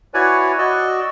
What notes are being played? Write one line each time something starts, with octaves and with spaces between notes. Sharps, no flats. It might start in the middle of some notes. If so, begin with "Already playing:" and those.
E4 F#4 B4 C#5 D5 G#5
F#4 D5 D#5 E6